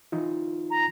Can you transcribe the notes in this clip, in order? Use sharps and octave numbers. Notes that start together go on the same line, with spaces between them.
E3 D#4 F4
A#5